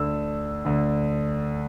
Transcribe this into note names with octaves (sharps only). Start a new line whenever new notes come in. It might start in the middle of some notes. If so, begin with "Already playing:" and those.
Already playing: D2 D3 E6
D2 D3